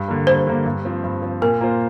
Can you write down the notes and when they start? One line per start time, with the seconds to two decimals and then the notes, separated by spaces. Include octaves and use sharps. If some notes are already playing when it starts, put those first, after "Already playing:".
Already playing: G2
0.08 D3 A#3
0.27 G2 C5
0.47 D3 A#3
0.66 G2
0.85 F3 C4
1.03 G2
1.22 F3 C4
1.42 A#2 A#4
1.61 A#3 F4 C5